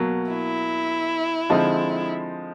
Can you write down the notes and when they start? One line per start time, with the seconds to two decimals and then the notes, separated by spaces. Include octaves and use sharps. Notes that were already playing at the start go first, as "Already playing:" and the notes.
Already playing: B2 F#3 A#3
0.31 E4
1.49 D3 F3 G#3 C4 D#4